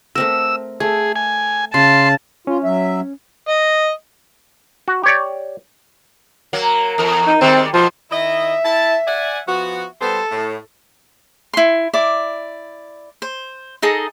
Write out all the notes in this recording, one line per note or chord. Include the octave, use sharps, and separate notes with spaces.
A3 C4 A#4 E6
A3 G#4
G#5
C#3 A5 C6
C#4 F4
F#3 E5
D#5
F#4
G4 C#5 D5
F#3 A#3
E2 A#4
D#4
D#3 G3 G#3 C4
B2 F3
D#3 E4 D#5 E5
E4 A5
D5 F#5 G#5
F3 B3 F#4
G3 B3 A4 C5
A2
E4 C6
E4 D5 D6
C5
D#4 G#4 A4 D#5